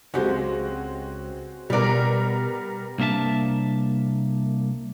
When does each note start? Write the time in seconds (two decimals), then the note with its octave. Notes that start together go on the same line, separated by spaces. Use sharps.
0.14 C#2 G#3 C4 F#4 G4
1.70 B2 G3 B3 A#4 D5
2.99 C2 A#3 D4 E5 A5